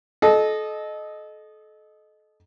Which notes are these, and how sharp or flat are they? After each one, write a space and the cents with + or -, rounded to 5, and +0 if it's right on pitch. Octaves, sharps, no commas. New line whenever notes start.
A4 -30 D#5 -10